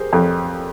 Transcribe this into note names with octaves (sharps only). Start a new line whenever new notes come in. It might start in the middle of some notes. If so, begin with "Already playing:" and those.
Already playing: G4 G#4 A#4 C5
F2